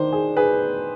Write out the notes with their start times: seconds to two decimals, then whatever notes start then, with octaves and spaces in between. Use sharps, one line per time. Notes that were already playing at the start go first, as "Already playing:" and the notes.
Already playing: D#3 D4 C5
0.13 G#4
0.37 G#4 B4